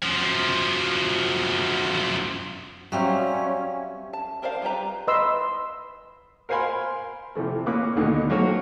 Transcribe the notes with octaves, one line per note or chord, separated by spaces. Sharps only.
F#2 F3
F#3 G3 C4 C#4 E5 F5
A5
C4 A#4 C5 D5 F5
G3 F4 G4 B4 A#5
B4 D#5 B5 C6 E6
A#4 C5 F5 G#5 B5 C6
C3 E3 F3 A3
A#2 A#3 C#4 B4 D6
D2 B2 D3 D#3 A#3 D#4
F#3 A3 A#3 C4 F#4